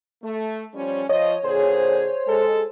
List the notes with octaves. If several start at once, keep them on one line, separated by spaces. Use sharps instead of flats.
A3
F3 G3 C#4
F3 C#5 D#5
A#2 D3 G#4 C5
G#3 A4